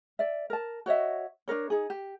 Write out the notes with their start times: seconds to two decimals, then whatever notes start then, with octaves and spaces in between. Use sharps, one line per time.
0.19 D5 E5
0.50 A#4 A5
0.86 F#4 C#5 D#5 E5
1.48 D4 F#4 A#4 C#5
1.70 D#4 G#4
1.90 G4